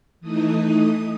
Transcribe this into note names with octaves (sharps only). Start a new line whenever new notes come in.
E3 A3 D#4 D#6
D#6